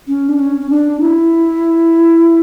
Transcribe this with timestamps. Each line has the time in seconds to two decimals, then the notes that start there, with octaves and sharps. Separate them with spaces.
0.08 C#4
0.29 D4
0.39 C#4
0.61 C#4
0.70 D4
1.00 E4